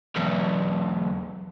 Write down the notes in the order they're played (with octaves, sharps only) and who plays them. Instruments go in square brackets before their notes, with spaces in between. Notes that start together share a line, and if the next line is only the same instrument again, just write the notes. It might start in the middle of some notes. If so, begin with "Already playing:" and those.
[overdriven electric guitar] B1 E2